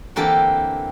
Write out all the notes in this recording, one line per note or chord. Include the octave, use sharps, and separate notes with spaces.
D3 E3 A#3 C4 G4 A4